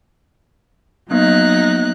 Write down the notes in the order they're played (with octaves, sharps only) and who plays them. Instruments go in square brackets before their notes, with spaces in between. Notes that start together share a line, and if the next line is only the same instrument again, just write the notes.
[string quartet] F#3 D#4 F#6 [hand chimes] A#3 B3